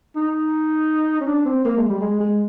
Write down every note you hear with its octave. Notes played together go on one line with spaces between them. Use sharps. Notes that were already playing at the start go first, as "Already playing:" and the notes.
D#4
C#4
D4
C4
A#3
G#3
G3
G#3
G#3